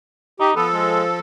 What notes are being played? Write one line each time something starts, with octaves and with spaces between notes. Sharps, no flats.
D#4 G4
F3 B3 A4
G#3